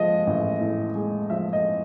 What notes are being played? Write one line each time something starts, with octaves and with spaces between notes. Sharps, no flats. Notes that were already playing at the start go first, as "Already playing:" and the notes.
Already playing: F3 G#3 D#5
A1
A2
G#3
F3 E5
D#5